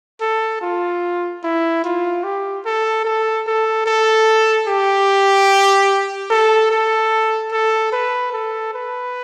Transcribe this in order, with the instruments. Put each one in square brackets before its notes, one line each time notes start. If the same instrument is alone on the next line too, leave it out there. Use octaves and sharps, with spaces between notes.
[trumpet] A4
F4
E4
F4
G4
A4
A4
A4
A4
G4
A4
A4
A4
B4
A4
B4